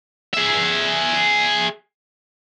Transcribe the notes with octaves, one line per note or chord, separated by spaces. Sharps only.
G#4 E5